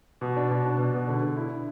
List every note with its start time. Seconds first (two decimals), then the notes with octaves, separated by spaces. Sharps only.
0.21 B2
0.36 D4
0.50 B2
0.65 D4
0.78 B2
0.94 B2
1.08 D3
1.22 D3
1.37 E4